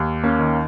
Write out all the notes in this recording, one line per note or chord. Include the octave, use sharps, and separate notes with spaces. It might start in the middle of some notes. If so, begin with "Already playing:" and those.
Already playing: D#2
A#3 C#4
D#3